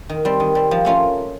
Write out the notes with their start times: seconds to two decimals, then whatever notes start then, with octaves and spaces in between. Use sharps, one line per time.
0.09 D#3
0.25 G3 C4
0.40 D#3
0.55 G3 C4
0.71 F3
0.85 A3 C#4 F4 A#4